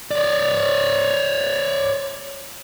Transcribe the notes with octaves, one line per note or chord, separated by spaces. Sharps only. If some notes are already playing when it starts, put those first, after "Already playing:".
C#5 D5